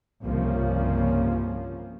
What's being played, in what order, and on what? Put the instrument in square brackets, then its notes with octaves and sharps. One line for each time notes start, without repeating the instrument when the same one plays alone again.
[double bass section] C2 G2 C#3 F3 A#3 C#4